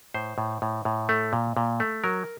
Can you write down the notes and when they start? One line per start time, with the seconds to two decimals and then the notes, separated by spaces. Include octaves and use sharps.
0.14 A2 C5
0.38 A2
0.62 A2
0.85 A2
1.09 A3
1.33 A#2
1.57 A#2
1.80 A3
2.04 F#3 A#4